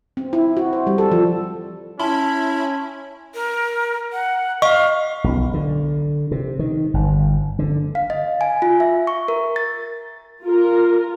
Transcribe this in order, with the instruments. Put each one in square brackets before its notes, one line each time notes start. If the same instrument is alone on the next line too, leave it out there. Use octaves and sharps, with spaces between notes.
[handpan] C4
E4
F#4
C5
G3
A4
F3
[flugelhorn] C#4 [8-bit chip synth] E4 E5 B5 [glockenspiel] A5 C6
[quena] A#4
F#5
[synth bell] D#5 C#6 [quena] F5
[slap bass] B1
D3
C3
D#3
G1
D3
[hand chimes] F5
D#5
G#5
F4
E5
C#6
A#4
A6
[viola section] F4 A#4